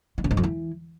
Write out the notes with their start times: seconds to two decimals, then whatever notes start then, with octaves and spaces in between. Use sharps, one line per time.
0.18 E3
0.24 C#3
0.31 G#2
0.37 F2
0.44 E3